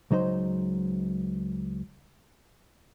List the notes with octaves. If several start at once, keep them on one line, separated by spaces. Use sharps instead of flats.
C#2 F#3 D#4 C5